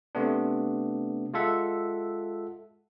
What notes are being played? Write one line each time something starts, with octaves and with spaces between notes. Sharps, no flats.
C3 A3 B3 D4
G#3 F4 A4 E5 F#5